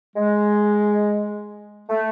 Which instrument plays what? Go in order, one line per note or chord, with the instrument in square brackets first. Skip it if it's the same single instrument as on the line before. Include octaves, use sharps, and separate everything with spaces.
[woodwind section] G#3
A3